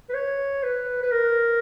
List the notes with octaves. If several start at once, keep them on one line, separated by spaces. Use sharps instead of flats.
B4
C#5
B4
B4
A#4